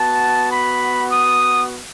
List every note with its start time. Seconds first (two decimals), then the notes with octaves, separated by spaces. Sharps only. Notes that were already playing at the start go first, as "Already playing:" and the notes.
Already playing: B3 F#4 A5
0.50 B5
1.09 D#6